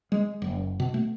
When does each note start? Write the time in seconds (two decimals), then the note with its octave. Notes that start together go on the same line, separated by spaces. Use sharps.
0.12 G#3
0.42 F#1
0.80 B2
0.94 A3